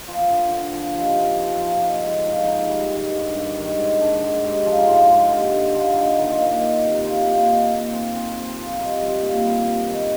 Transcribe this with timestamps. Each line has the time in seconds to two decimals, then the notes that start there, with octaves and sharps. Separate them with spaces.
0.08 F3 F4
0.31 D3
0.51 D3
0.73 F3
0.95 F3 D#4 G4
1.17 C4
1.39 F3
1.61 F3
1.83 D#4 F4
2.05 G#2
2.25 F3 D#4
2.47 D#4
2.69 G3
2.92 D#3
3.13 G2
3.34 G2
3.57 D#3
3.78 G#2
4.01 D4
4.22 G#2
4.44 G#2 D#4 G4
4.65 F3
4.78 D#4
4.87 G#2 F4
5.10 G#2
5.31 D3 D#4 G4
5.53 D3
5.74 D3 F4
5.96 D#4
6.19 D#3 D#4
6.31 F4
6.40 A#3 D#4
6.61 D#3
6.84 C3
6.94 D#4
7.05 D#4 F4
7.27 A#3
7.49 D#4
7.70 A#3
7.93 C4
8.15 C4
8.35 C4
8.58 F3
8.79 G3 D#4
9.01 G3
9.23 A#2
9.46 G3
9.67 C3
9.88 D#3